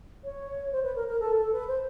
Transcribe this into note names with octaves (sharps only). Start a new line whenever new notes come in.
C#5
C5
B4
A#4
A#4
A4
A4
B4
C5